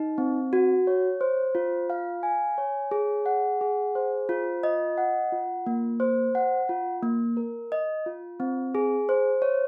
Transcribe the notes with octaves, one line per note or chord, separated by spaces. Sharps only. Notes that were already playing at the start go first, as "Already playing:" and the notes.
Already playing: D#4
C4
F#4
C#5
C5
F4
F5
G#5
C#5
G#4
F#5
G#4
C5
F4
D#5
F#5
F4
A#3
C5
F#5
F4
A#3
A#4
D#5
F4
C4
G#4
C5
C#5